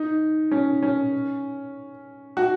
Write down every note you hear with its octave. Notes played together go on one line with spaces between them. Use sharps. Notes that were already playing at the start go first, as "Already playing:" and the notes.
Already playing: D#4
C#4
C#4
F#4